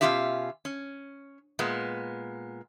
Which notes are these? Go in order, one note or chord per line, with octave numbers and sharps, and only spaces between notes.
B2 G3 C#4 F4 G4 E5
C#4
A#2 G#3 B3